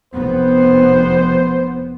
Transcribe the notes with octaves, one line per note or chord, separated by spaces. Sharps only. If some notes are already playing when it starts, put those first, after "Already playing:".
F1 B3 C5